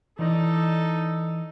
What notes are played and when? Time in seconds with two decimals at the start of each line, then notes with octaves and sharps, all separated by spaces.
0.19 E3 D#4 A4 D5 D#5